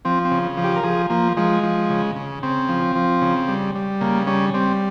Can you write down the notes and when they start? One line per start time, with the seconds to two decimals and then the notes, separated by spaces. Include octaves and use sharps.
0.05 F3 C4
0.25 C4
0.31 C#3
0.57 F3
0.64 G4
0.76 A#4
0.83 F3 G#4
1.10 F3 A#3
1.37 F3 G#3
1.63 F3
1.90 C#3
2.16 C#3
2.43 C#3 C4
2.69 F3
2.96 F3
3.21 C#3
3.48 G3
3.75 G3
4.01 C#3 A#3
4.27 G3 C#4
4.54 G3 C4